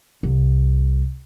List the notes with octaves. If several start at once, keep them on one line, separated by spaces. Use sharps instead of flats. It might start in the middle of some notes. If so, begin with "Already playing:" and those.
C2